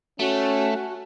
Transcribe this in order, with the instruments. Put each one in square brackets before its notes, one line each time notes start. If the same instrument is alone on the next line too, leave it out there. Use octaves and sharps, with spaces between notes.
[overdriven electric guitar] A3 [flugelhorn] C#4 [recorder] F#4